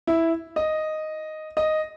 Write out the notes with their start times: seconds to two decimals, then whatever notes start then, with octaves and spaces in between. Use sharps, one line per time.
0.07 E4
0.56 D#5
1.57 D#5